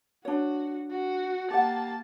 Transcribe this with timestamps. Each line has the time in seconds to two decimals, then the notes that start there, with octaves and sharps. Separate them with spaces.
0.25 D4 F#4 C#5
0.91 F#4
1.51 A#3 G4 F#5 A5